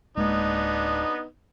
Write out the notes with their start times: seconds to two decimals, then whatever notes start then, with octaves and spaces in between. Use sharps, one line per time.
0.17 D1 G#3 A#3 B3 D4 D#4